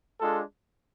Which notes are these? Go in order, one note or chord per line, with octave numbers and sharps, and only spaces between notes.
G#3 D4 F4 A4